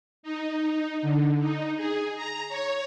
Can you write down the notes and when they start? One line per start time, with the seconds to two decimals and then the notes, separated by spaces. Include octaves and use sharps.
0.23 D#4
0.71 D#4
1.02 D3
1.41 D#4
1.77 G#4
2.16 A#5
2.49 C#5